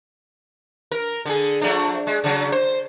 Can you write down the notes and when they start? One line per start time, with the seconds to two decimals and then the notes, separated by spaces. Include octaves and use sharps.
0.92 A#4
1.25 D3 G#4
1.61 F3 A3 D4
2.07 G#3
2.24 C#3 F#3
2.52 C5